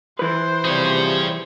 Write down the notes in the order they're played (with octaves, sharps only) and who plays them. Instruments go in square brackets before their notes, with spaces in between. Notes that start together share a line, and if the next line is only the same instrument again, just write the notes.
[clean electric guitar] E3 B4 [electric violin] C5
[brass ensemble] C3 F3 G3 [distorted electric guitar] G#4 C#5